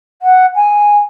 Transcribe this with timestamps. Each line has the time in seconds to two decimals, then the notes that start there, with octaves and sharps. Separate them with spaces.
0.22 F#5
0.55 G#5